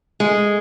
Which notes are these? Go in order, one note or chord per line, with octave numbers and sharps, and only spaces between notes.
G#3